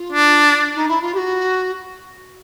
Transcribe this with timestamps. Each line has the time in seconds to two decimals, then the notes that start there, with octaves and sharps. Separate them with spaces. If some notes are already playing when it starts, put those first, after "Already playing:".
Already playing: F4
0.12 D4
0.75 D#4
0.88 E4
1.01 F4
1.14 G4
1.17 F#4